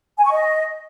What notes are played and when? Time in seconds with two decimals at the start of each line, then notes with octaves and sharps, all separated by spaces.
0.18 G#5
0.25 C#6
0.32 D#5